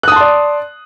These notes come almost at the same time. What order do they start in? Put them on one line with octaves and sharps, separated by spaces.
F#6 D#6 A5 C6 D5